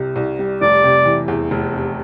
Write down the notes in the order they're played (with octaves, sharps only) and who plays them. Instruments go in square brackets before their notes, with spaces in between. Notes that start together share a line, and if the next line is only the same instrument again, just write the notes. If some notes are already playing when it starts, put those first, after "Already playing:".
Already playing: [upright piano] C2 C3 G3
C2
G3
[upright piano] F1 [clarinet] D5
[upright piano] C3
E3
E2
F1
C3